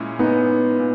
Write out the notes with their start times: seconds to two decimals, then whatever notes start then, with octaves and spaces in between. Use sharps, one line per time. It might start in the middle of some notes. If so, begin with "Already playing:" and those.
Already playing: A#2 G#3 C#4 E4
0.19 B3 D#4
0.80 A#2